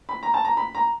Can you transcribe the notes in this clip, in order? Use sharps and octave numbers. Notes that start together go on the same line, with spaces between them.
B5
A#5
A5
A#5
B5
A#5